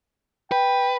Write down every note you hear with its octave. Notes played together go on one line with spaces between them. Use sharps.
B4 G5